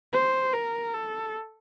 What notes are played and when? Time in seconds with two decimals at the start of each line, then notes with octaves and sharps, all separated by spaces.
0.13 C5
0.53 A#4
0.94 A4